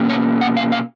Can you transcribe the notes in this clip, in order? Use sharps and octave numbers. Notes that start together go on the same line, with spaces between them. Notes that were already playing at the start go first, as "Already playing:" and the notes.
Already playing: B2 A#3 C#4
C#5
F#5
F5
F5